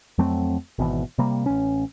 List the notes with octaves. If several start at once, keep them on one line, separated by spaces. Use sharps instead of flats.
F2 F#3 A3 C4
G#1 B2 E3
C3 G3 A#3
A1 C#4